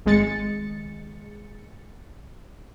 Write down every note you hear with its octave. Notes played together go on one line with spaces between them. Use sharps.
G#1 G#3 A6 C#7